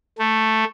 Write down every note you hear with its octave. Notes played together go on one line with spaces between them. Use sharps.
A3